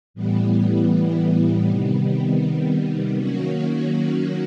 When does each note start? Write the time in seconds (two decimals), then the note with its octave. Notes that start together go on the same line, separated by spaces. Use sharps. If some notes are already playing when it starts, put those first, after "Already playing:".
0.14 A2 E3 G3 B3
1.65 C3 D#3 G3 B3
3.16 D#3 F#3 A#3 C#4 F#4